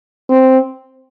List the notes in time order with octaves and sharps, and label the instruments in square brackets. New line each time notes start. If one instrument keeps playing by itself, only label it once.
[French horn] C4